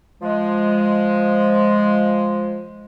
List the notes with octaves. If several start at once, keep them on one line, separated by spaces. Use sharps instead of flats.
F3 G#3